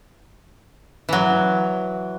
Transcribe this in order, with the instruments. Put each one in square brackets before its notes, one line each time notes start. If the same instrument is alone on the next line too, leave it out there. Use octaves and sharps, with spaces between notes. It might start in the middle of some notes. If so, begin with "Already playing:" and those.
[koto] E3 F#3